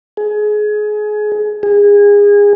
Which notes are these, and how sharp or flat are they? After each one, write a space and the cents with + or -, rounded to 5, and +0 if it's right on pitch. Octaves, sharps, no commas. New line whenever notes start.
G#4 +25
G#4 -25